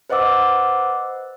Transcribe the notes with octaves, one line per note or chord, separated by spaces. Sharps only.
B4 C5 D#5 F#5 D6 E6